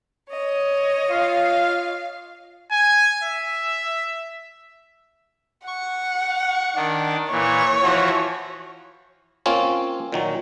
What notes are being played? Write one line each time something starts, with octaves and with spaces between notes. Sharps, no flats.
C#5 D#5
F4 F5
G#5
E5
F#5 C#6
D#3 D4
A#2 E3 C#5
E3 F3 F#4
A#3 C4 C#4 F4 C#5
A#2 D#3 F#3